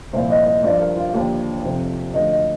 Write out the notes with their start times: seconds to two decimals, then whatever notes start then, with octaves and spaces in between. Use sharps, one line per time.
0.13 C2 A#2 F3 C5
0.30 D#5
0.46 D#5
0.63 G2 F3 D5
0.79 A#4
0.96 F4
1.13 D#2 D3 F3 G4
1.63 F2 C3 F3
2.13 D2 D3 F3 D#5
2.31 D#5